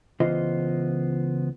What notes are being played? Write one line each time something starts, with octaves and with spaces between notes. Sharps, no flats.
C#2 E3 B3 F4 C5 D#5